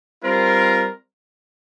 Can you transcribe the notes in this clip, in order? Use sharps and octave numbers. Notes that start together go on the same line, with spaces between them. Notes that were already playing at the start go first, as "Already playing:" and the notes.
G3 C4 F4 A#4